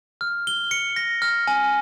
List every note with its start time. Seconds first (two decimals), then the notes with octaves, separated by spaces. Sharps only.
0.21 F6
0.47 G7
0.71 C#7
0.96 A#6
1.22 F6
1.47 G#5